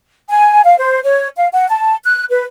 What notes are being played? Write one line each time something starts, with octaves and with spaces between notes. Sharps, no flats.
G#5
F5
C5
C#5
F5
F#5
A5
F#6
B4